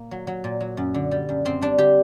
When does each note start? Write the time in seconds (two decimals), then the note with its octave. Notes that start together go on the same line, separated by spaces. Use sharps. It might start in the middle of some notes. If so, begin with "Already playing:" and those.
Already playing: A#2 A#3
0.11 F#3
0.27 F#3
0.44 A#2
0.60 F#3
0.77 F#2
0.94 D3
1.11 G3
1.29 F#2
1.45 F#2 C4
1.61 G3 D4
1.78 D3 G4